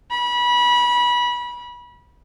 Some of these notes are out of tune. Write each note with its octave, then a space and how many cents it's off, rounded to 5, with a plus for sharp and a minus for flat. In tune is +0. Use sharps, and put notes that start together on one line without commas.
B5 -25